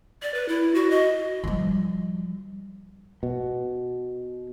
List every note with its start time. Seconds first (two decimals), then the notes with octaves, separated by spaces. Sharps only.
0.22 D5
0.34 B4
0.48 E4
0.75 F#4
0.90 D#5
1.44 F3 G3
3.23 B2